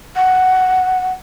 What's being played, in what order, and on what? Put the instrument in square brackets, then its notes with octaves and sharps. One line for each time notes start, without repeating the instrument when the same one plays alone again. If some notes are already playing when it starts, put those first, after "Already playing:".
[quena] F#5